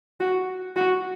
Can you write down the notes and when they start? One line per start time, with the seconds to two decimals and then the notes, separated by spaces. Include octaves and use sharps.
0.20 F#4
0.76 F#4